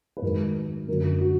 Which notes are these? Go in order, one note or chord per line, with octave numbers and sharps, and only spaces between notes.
B4
G#2 D#3 F#3 A#4
F#2 D3 F#3 A#4
F#4